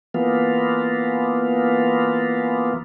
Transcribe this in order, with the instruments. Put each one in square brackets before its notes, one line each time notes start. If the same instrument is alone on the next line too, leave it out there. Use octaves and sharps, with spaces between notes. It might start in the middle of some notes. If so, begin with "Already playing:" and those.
[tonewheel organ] E3 A#3 B3 F4